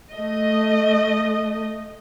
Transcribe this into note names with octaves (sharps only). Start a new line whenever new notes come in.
A3 D#5